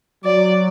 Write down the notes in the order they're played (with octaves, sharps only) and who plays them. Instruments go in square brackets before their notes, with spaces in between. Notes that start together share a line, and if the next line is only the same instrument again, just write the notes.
[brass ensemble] F#3 [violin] D5